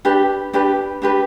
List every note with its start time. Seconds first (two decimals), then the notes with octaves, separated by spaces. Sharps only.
0.05 D4 G4 B4
0.53 D4 G4 B4
1.02 D4 G4 B4